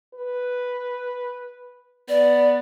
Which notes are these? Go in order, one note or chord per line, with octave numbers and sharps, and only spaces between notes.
B4
B3 D5